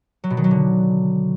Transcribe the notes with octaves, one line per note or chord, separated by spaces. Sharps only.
F#3
B2
D#3
F#3
D3